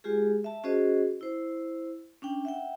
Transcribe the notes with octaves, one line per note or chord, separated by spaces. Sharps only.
G#3 F4 G4 G#4
E5 A5
C#4 F#4 G#4 C5 D#5
E4 C5
C#4 D4 G5
E5 F#5 G5